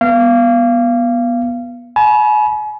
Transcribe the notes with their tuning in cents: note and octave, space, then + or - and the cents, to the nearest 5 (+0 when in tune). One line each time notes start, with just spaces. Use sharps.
B3 -20 F5 -25
G#5 +40 B5 -35